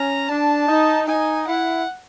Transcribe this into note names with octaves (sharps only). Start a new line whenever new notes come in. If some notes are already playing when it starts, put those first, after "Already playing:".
Already playing: C#4 A#5
D4 A5
D#4
D#4 G#5
E4 F#5